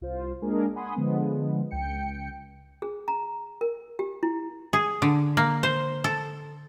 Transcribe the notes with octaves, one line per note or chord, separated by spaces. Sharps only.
C2 F4 C5
G#3 A#3 D4 G#4 A#4
F#5 G#5 B5 C6 D#6
D3 F3 G#3 B3
C#2 G5 C#7
G#4
A#5
A#4
G4
E4
G#4
D3
A#3
C5
A4